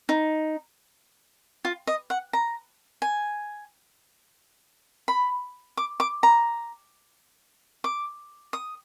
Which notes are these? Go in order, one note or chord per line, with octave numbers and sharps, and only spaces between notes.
D#4
F4
D#5
F#5
A#5
G#5
B5
D6
D6
A#5
D6
D#6